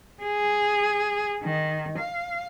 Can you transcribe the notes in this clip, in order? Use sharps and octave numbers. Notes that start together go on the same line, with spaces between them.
G#4
D#3
F5